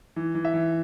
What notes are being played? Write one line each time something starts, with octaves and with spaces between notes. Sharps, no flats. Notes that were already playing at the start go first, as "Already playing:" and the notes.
E3
E3
E5
E3